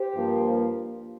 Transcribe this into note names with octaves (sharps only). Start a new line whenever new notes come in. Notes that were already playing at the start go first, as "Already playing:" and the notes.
Already playing: G4 C5
G2 F3 A#3